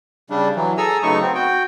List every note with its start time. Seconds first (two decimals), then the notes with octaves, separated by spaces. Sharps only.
0.30 C#3 G3 D4
0.56 E3 F#3
0.78 G#4 A4 G#5 A#5 E6
1.03 C#3 F#3 A3 B3 D#4 C#6
1.21 B3 C4
1.35 F#4 G5